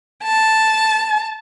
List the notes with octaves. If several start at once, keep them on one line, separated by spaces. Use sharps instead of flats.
A5